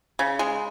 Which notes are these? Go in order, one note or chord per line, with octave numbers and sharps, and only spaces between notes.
C#3
G#3